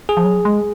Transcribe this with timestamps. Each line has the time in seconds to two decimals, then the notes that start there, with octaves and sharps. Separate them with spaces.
0.09 G#4
0.17 F3
0.25 F#3
0.45 G#3